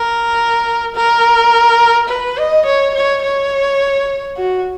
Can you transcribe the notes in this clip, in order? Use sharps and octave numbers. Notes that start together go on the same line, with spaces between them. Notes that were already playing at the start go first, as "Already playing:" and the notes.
Already playing: A#4
A#4
B4
D#5
C#5
C#5
C#5
F#4